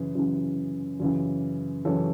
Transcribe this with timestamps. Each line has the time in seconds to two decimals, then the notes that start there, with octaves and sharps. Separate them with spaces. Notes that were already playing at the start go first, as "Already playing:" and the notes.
Already playing: F#2 C#3 E3
0.15 F#2 C#3 E3
1.00 F#2 C#3 E3
1.85 F#2 C#3 E3 A4 C#5